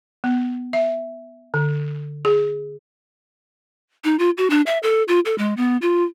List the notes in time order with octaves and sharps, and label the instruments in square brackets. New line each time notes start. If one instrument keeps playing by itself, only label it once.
[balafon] B3
E5
D3
G#4
[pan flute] D#4
F4
F#4
D4
E5
A4
F4
A4
G#3
B3
F4